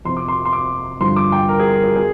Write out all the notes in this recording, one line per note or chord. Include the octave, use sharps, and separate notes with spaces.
F2 C3 F3 C6
D6
C6
C6
D6
G2 D3 F3 C6
D6
G5
A#4
G#4
A#4
G#4
G#4